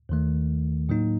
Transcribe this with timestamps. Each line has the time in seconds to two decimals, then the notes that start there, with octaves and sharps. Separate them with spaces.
0.09 D#2 D#3 A3
0.89 A2 F#3 A#3 D#4